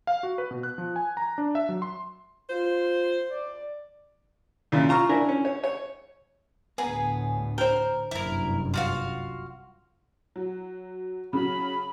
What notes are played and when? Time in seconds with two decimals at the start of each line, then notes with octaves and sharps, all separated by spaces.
0.07 F5
0.23 F#4
0.38 B4
0.51 B2
0.63 F#6
0.78 F3
0.96 G#5
1.17 A#5
1.38 D4
1.55 E5
1.69 F#3
1.82 C6
2.49 F4 C5
3.30 D5
4.72 A#2 C#3 E4
4.89 F4 A#5 C#6 F6
5.09 D4 E4 A#4 G#5
5.28 C#4
5.45 C#5
5.64 C#5
6.78 D2 A2 B3 G#4 A#5
7.58 A#4 C5 G5
8.11 F#1 C2 G2 E4 A#4
8.74 F4 F#4 F5
10.36 F#3
11.33 C#3 F#3 B5